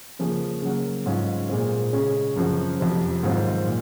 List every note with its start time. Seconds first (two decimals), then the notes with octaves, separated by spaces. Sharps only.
0.19 C#3 F3 A#3 C#4 G#4
0.62 C#3 F#3 A#3
1.06 G#2 F#3 C#4 F4
1.49 A#2 G#3 C4
1.92 C#3 G#3 C#4
2.36 F#2 C#3 F3 C4 F#4
2.80 F2 C3 F3
3.23 G#2 D#3 F#3 C4 F4
3.66 A#2